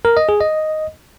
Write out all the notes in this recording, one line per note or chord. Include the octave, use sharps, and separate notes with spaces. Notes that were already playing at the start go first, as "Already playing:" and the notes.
A#4
D#5
G#4
D#5